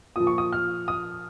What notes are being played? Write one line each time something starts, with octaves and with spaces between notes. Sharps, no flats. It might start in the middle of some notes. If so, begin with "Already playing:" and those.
A#2 F3 D#6
C#6
D#6
F6
D#6